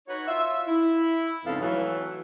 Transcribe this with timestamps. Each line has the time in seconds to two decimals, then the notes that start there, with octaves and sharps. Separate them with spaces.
0.08 D#4 F#4 B4 C#5
0.27 F4 E5
0.67 E4
1.46 F2 G#2 C#3 B3 A4 F5
1.61 E3 F#3 A3